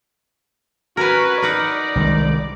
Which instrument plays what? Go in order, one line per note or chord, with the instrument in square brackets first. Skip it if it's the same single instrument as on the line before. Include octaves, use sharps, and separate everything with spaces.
[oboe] C#4 [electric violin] F#4 B4 [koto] A#4 G#5
[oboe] D#4 [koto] A#4 B4 F#5 [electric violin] D5
[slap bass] C2 D#3 G#3